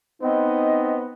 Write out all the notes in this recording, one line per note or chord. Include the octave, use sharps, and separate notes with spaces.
B3 C4 D#4 D#5